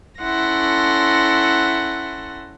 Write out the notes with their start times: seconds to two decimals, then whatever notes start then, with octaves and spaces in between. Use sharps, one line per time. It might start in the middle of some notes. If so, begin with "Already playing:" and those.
0.20 C#4 E4 A4 F#5 C6 A#6